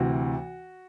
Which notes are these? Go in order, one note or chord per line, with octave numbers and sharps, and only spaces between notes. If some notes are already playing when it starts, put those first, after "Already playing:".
Already playing: D2 C3 E3 F#4